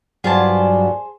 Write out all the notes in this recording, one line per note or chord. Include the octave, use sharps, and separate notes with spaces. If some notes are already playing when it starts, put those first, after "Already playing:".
G2 F#3 B3 F4 G#4 C5 D5 A5